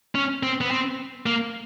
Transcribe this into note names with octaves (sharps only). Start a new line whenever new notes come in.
C#4
C4
B3
C4
A#3